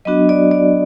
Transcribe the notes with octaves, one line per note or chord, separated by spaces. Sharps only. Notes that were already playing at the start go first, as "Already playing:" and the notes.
F#3 B3 D4 F#4 D#5
D5
D5